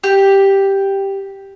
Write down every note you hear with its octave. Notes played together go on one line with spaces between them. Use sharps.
G4